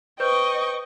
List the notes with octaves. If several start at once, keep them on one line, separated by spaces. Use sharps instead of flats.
B4 C5 D#5 G5 C#6 G6